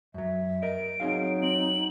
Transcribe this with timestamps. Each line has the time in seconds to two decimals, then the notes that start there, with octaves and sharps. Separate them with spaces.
0.14 F#2 F#3 E5
0.62 A#4 D#5 D7
1.00 F#3 C4 D#4 G#4 F5
1.43 C4 F#7